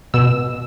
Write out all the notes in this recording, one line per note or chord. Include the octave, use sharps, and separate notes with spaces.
B2 E6